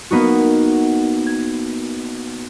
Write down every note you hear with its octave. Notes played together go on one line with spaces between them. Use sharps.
A#3 B3 D#4 F#4
G#6